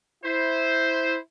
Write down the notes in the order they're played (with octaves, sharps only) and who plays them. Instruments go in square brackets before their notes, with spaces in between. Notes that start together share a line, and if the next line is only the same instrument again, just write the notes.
[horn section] E4 C5